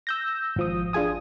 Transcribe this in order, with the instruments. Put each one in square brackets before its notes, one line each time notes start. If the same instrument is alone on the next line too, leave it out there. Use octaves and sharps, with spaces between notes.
[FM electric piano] E6 G6 A#6
G#1 F3 D#6
D4 F4 G#4 G#5 D#6